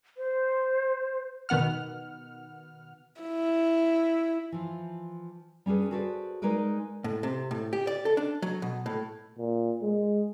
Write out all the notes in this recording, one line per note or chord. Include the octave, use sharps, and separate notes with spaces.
C5
B2 D#3 B3 F#5 F6
E4
E3 F3
G3 C#4 D4 G#4 B4
F#4 G#4 A4 B4 C5 D5
G#3 D#4 A#4 B4 D5
A2
C3
A2
G4
D5
A4
D4
F#3
B2
A2
A#2
G#3